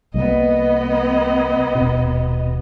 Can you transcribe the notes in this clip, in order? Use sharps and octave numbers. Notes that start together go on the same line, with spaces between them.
C2 G3 A#3 B3 D#5
D#1 B2